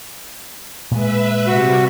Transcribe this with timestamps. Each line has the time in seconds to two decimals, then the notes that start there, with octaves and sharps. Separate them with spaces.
0.91 A#2 G#3 B4 E5
1.47 C3 G3 F#4